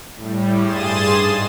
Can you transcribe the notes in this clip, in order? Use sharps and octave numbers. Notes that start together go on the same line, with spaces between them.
A2 G3
G2 G#4 C6 D#6 A6 E7
G#2